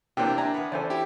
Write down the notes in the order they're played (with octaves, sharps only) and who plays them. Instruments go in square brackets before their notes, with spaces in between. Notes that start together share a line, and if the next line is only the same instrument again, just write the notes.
[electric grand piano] C3 D4 [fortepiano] E3 A#3 C4 [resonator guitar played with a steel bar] G5
[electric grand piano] D4 [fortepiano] E5 G#5 A#5
[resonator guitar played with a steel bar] E2 B3
[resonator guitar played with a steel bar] E3 C#4 G#5 [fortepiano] A4 C5 D5
[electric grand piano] E4 G4